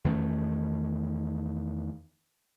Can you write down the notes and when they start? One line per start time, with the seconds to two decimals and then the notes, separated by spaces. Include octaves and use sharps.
0.04 E2 D#3 A3 C#4